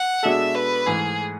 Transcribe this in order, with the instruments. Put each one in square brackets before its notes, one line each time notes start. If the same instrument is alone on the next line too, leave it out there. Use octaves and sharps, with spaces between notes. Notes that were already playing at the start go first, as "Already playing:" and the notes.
Already playing: [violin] F#5
[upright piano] B2 G#3 D4 F#4 A4 [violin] E5
[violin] B4
[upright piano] G#2 E3 A3 [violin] G#4